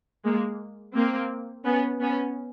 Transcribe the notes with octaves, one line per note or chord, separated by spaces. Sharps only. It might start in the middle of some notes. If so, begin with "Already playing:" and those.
G#3 A#3
A#3 C4
B3 C#4
B3 C#4